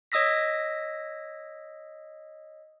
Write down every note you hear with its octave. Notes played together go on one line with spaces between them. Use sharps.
C#5 D#5 D#6 E6 A#6 B6